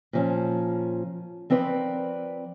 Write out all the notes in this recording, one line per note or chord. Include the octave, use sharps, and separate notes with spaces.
A#2 F3 C#4
F3 C4 A#4 B4 D5